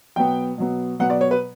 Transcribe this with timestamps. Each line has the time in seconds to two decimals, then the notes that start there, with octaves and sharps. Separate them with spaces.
0.16 B2 F#3 B3 G5
0.58 B2 F#3 B3
0.99 B2 F#3 B3 F#5
1.10 D5
1.21 C#5
1.31 B4